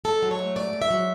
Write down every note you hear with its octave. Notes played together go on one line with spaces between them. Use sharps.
G#2 A4
F#3
C#5
A3
G#2 D5
G#2
E5
F#3